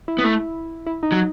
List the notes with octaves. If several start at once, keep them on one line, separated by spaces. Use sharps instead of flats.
E4
B3
A3 E4
E4
D#4
F#3